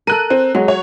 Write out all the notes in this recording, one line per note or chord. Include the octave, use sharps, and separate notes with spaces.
A4 A#4 F#6 D#7
C4
F#3 G#3
C#5